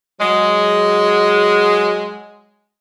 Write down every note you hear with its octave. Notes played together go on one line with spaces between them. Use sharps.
F#3 G#3